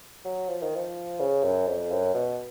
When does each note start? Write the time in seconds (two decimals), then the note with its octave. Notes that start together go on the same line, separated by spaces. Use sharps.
0.25 F#3
0.48 F3
0.62 D#3
0.76 F3
1.20 C#3
1.44 F#2
1.67 F2
1.91 F#2
2.14 B2